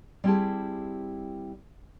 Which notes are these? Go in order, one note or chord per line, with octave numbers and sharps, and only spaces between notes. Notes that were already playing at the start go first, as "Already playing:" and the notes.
G3 C4 E4 G4 G#4 A5